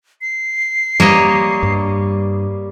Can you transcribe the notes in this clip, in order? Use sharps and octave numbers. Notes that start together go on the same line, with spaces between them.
C7
G3 A#3 C#5 D#5
G2